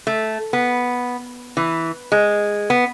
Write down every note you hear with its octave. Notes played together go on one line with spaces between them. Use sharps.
A3
B3
E3
G#3
B3